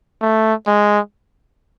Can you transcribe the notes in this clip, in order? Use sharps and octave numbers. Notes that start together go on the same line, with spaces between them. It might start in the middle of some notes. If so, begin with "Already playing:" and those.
A3
G#3